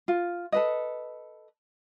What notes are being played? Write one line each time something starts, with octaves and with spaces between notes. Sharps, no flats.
F4
A4 B4 D#5